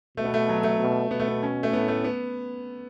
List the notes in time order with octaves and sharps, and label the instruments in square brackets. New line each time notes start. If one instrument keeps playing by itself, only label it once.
[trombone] B2 [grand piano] A3
[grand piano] B3
A3
F#3
A3
[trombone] B2
[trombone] B2 [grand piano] B3
[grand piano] A3
B3
C#4
A3
[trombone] A2 [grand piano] B3
[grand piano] A3
B3